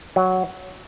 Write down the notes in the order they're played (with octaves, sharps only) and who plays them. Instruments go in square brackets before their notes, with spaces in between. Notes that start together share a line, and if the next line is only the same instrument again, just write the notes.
[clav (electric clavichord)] F#3